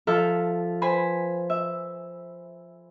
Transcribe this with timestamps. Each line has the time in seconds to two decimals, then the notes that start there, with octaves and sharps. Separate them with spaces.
0.07 F3 A4 E5 F6
0.82 B4 C5 G#5 B5
1.50 E5